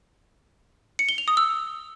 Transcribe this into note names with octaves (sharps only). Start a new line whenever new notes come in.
C#7
G7
F7
D#6
E6